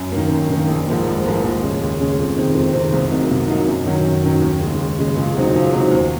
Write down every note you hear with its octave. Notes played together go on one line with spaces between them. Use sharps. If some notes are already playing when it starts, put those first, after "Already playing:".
Already playing: F#2
A#3
D#3
F#2
D#3 A#3
A#1
G#2 F3 A#3
A#1
G#2 F3 A#3
D#2
C#3 G#3 C#4
D#2
C#3 G#3 C#4
F2
C3 D#3 G#3 C4
F2
C3 D#3 G#3 C4
C2
C3 F#3 A#3 D#4
C2
C3 F#3 A#3 D#4
F#2
D#3 F#3 C#4
F#2
D#3 F#3 C#4
D#2
C#3 G#3
D#2
C#3 G#3
C#2
C3 F#3 C4 D#4
C#2
C3 F#3 C4 D#4
D#2